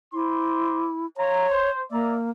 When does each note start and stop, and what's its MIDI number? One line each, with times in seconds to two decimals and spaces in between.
0.14 1.06 64
0.14 0.88 72
0.14 0.88 84
0.14 0.88 86
1.17 1.46 65
1.17 1.70 73
1.17 1.46 82
1.50 1.81 72
1.91 2.30 58
1.91 2.16 74
1.91 2.16 76
1.91 2.16 82